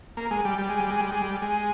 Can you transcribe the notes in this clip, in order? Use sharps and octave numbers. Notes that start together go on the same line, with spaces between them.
A#3
G#3
G3
G3
G#3
G3
G#3
G3
G#3
G3
G#3